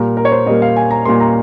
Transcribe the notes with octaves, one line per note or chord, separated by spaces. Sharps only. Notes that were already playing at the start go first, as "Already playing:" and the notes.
Already playing: A#2 G3 A#3 A#4
A#4
C#5
C5
A#2 G3 A#3 D#5
F5
G#5
A#5
A#2 G3 A#3 C6
A#5